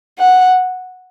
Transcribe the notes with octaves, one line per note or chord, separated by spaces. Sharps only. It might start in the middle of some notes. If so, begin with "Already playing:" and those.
F#5